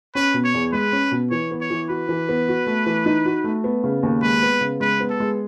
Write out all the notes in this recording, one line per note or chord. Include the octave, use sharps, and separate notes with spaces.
C#4 B4
B2
C#5
E2
G#3 B4
C#4
B2
E3 C#5
B3
C#5
E3
F#4 B4
E3
B3
F#4
A3
E3
D#4
F#4
A3
B3
C#3
D#2
G#3 B4
B3
C#3
G#3 B4
B3
A4
G#3